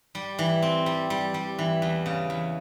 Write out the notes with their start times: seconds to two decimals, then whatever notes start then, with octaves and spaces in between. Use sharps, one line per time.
0.15 G3
0.39 E3
0.62 C4
0.86 G3
1.10 G3
1.34 G3
1.58 E3
1.82 E2
2.06 C#3
2.30 E2